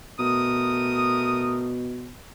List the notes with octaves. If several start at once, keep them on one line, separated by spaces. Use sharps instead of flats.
B2 A3 A#4 D#6